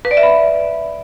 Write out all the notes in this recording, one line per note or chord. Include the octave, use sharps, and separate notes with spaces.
B4
D5
E5
B5